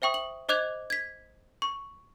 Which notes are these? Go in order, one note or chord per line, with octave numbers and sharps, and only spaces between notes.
C5 E5 G5 C#6 D#6
F#7
C5 D#5 D6 F#6 G#6 F7
G#6 B6
C#6